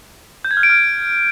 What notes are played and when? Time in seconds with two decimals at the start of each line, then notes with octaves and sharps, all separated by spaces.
0.45 G6
0.51 G#6
0.57 F6
0.63 D7
0.69 F6